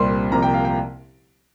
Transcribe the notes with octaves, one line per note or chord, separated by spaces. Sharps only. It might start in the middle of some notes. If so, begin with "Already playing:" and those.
Already playing: C2 A#2 G3 C4 C6
C2 C3 F3 A#3 A#5
G5
F5
G5